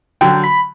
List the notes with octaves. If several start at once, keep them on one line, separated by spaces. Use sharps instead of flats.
D3 F#3 G5
B5